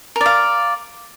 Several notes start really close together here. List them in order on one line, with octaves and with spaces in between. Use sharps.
A#4 D5 F5